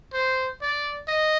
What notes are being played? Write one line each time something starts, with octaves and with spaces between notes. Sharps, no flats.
C5
D5
D#5